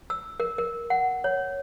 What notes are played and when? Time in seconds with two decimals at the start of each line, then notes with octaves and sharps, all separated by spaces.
0.10 E6
0.40 A#4
0.58 A#4
0.90 F#5
1.24 C#5